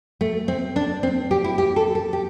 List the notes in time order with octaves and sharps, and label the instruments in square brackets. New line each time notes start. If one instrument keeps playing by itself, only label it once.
[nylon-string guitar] A3
C4
D4
C4
G4
E4
G4
A4
A4
G4